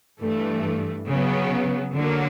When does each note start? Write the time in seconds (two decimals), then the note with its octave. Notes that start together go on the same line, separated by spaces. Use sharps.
0.20 G2 E3 A3
1.08 C#3 F#3 B3
1.94 D3 F#3 A#3